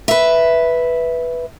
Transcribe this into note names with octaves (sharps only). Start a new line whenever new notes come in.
B4 E5